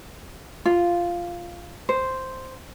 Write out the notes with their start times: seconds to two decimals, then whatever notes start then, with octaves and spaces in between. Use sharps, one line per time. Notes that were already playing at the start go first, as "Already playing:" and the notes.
0.66 F4
1.89 C5